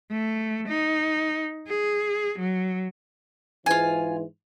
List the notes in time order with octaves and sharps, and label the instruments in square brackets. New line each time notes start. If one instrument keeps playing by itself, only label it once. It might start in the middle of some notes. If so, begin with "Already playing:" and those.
[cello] A3
D#4
G#4
F#3
[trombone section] G#2 E3 [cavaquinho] F4 G#5